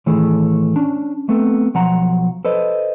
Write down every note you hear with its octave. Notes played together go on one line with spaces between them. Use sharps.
A2 D#3 E3 A3 G#4 A4
C#4 D4
A3 B3 C4 A4
B1 F3 F#3 F#5 A#5
A4 B4 C5 D#5